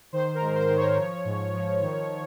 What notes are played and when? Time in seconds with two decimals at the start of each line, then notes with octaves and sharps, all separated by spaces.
0.12 D#3 C5
0.34 A#4
0.40 G#2
0.55 C5
0.69 D#3
0.76 C#5
0.98 F3
1.25 G#2
1.54 F3
1.81 D#3